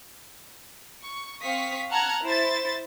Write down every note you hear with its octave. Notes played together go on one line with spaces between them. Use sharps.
C#6
C4 F5 C#6 D#6 B6
F#5 A5 A#5 F6 F#6 G#6
E4 C5 A6